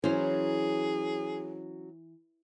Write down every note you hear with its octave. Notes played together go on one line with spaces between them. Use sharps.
E3 F#3 C#4 G#4 C5 A#5 C6